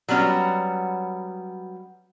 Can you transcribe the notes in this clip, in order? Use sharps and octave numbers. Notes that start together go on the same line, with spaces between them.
F#3 G3 B3 C#4 F#4